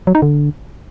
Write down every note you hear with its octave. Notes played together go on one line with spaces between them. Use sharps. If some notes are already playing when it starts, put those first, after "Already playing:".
F#3
D#4
D3